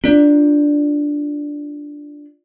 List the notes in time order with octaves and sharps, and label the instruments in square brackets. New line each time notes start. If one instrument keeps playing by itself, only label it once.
[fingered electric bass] C4 D4 [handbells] F4 D5